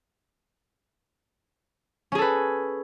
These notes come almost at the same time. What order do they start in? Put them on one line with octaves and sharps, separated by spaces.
C#4 G#4 A4 B4